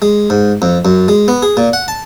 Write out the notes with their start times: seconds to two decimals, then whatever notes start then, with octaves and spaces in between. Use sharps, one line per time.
0.02 G#3
0.30 G#2
0.62 F2
0.85 F#2
1.08 G#3
1.28 B3
1.42 G#4
1.57 A#2
1.73 F#5
1.88 A5